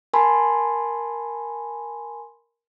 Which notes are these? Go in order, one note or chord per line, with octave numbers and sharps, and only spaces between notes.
A#4 G#5 A5 B5 C6